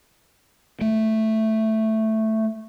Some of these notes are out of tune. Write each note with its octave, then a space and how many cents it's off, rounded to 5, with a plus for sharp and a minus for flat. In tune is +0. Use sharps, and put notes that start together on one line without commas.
A3 +0